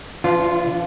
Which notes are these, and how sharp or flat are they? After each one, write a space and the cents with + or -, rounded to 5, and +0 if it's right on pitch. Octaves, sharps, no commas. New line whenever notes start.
E3 +40 D4 -30 F4 -5